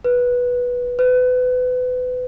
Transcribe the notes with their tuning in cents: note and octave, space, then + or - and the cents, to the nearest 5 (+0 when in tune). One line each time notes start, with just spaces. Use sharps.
B4 -10
B4 +30